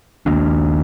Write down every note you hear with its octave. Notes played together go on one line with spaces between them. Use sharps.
D#2 D#3 A#3 D4